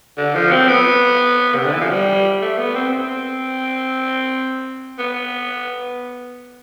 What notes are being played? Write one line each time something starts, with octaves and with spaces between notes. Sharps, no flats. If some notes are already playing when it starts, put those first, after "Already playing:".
D3
F3
C4
B3
C3
D3
E3
F3
G3
A3
B3
C4
C4
B3